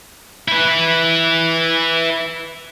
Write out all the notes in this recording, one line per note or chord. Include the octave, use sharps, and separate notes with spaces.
E4 B4